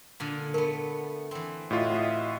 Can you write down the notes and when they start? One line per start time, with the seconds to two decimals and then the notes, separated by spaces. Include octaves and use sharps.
0.20 A#2 D3 G#5
0.54 A3 B3 A#4
1.31 E3 C4
1.71 A2 F4 F#4 D#5 E5